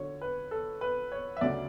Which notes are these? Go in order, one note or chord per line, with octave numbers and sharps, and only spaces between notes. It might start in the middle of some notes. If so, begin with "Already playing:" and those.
Already playing: D3 F#3 C#5
B4
A4
B4
C#5
E5
D2 C#3 F#3 D5